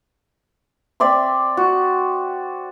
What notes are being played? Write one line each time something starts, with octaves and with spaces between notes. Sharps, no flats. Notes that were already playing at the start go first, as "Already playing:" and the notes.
C4 D5 E5 C6
F#4